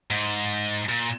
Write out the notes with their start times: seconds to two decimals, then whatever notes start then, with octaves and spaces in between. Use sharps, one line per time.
0.10 G#2
0.89 A#2